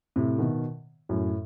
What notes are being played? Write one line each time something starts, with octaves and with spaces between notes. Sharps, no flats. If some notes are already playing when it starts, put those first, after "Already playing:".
A2 C3
B2 D#3
F#2 A2